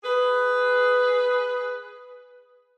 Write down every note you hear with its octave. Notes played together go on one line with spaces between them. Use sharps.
G#4 B4